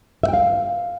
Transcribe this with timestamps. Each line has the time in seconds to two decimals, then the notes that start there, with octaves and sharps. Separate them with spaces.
0.23 E5
0.28 G5
0.34 F5